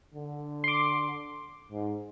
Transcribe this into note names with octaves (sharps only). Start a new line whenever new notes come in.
D3
C6 D6
G#2